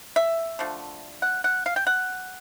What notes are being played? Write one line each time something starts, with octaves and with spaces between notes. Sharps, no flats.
E5
D3 F3 A3
F#5
F#5
F5
G5
F#5